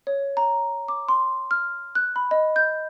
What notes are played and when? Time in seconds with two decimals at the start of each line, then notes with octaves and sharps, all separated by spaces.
0.07 C#5
0.37 A#5
0.88 D6
1.08 C6
1.51 F6
1.95 F#6
2.16 B5
2.31 D#5
2.56 G6